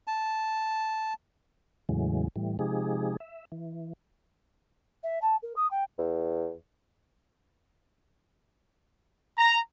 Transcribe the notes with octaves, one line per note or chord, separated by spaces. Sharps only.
A5
E2 A2 C#3 E3 F#3 G#3
A2 E3 G3
C3 F3 G#3 D#4 G4 G#4
E5
E3
E5
A5
A#4
D#6
G5
E2
A#5